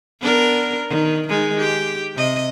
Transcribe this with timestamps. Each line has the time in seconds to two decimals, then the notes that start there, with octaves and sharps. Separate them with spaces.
0.21 B3 D4 A#4
0.89 D#3
1.28 D#3 G#3 D#4
1.59 G4
2.15 C3 D#5